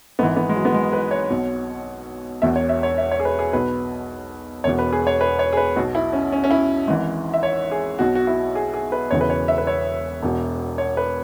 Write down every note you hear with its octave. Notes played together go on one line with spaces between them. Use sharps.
G#1 G#2 E3 B3
B3
G#3
F#3
B3
G#3
B4
C#5
B1 B2
E1 E2 B2 E5
C#5
E5
C#5
E5
C#5
G#4
B4
G#4
B1 B2 B4
E1 E2 B2 C#5
B4
G#4
C#5
B4
C#5
G#4
B4
B1 B2 F#4
E4
C#4
C#4
C#4
E4
G#1 G#2 E3
E5
C#5
G#4
B1 B2 F#4
F#4
E4
G#4
G#4
B4
E1 E2 C#3 E3 C#5
B4
C#5
E5
B4
C#5
E1 E2 B2
C#5
B4